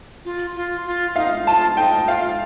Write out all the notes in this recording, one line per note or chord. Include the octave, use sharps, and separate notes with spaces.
F4
F4
F4
D#4 F5
F4 A5
D#4 G5
D#4
F4 F5